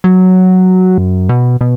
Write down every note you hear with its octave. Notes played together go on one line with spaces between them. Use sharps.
F#3
F#2
B2
B2